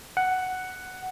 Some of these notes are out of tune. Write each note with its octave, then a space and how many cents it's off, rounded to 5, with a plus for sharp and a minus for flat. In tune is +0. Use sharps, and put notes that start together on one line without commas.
F#5 +5